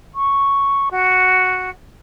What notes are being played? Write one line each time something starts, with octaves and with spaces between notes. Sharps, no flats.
C#6
F#4